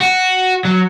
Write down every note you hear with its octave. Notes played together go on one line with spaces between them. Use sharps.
F#4
F#3